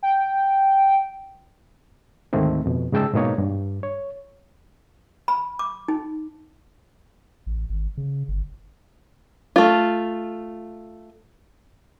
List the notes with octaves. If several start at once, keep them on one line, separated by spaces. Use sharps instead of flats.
G5
D2 G#2 D#3 A3 C4
F2 B2
G#2 C#3 G#3 G5 A5 E6
G#2 B2 A#3 D#4 C#5
G2
C#5
B5
D6
D#4
A1
G#1
C#3
G1
A3 F4